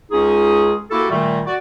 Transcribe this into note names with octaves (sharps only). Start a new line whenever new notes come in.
C#2 C#4 D#4 F4 G#4
A#3 E4 F#4 G4 A4
A#2 D#3 G3 A3
F#4 D5